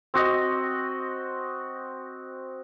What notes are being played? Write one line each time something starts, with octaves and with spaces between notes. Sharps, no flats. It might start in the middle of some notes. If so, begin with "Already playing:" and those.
C4 F#4 D#5